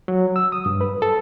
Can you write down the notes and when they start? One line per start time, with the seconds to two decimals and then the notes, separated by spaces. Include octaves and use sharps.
0.08 F#3
0.36 E6
0.52 D#6
0.66 G2
0.81 B4
1.02 A4